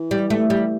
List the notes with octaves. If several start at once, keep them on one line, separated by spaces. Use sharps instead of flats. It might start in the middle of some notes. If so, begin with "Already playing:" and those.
Already playing: E3
G3
A3
G3